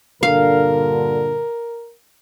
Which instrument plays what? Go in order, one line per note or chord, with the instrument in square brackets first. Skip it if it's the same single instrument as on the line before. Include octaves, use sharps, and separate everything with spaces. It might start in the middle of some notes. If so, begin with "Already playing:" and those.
[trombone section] G2 A#2 D3 [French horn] A#4 [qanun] F5